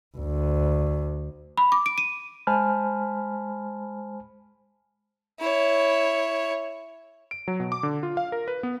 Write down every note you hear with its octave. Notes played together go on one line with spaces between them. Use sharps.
D2
B5
D6
D7
D#7
G#3 C5 G#5 A5 B5 F6
E4 C#5
D7
F#3
B2
D6
D3
F4
F5
A#4
B4
B3